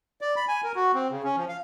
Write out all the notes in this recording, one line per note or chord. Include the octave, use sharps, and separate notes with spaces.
D5
B5
G#5
A#4
F#4
C4
C#3
C#4
F3
F5